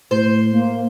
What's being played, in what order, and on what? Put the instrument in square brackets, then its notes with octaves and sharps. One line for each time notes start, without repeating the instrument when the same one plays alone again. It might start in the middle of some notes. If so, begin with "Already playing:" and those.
[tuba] A2 [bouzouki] C5
[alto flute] A#3